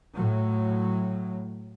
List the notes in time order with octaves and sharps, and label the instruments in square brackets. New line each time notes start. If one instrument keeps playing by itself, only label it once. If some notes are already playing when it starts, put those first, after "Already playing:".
[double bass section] A2 F#3